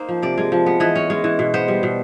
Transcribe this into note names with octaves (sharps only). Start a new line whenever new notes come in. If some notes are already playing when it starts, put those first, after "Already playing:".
Already playing: A#3 D#4 C5
F3
C3 D5
G#3
F3
B3
E3 D#5
C#4
G#3
E3
B2
B3 C5
G3
B2